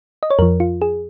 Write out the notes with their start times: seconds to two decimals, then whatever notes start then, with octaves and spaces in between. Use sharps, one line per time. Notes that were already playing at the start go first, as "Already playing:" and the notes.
0.23 D#5
0.30 C#5
0.39 F2 F3 A#4
0.60 F4
0.82 G#4